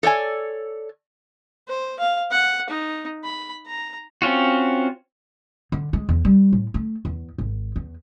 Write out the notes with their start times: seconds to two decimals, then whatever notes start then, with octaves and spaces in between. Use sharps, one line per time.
0.03 A4 C#5 D5 G#5
1.68 C5
1.99 F5
2.31 F#5
2.69 D#4
3.24 B5
3.66 A#5
4.22 C4 C#4 F4 F#4
5.72 D3
5.93 G#3
6.09 E2
6.25 G3
6.52 A2
6.74 A3
7.05 E2
7.38 G#1
7.76 E2